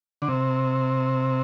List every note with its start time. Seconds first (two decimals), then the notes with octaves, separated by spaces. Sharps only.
0.22 D3
0.28 C3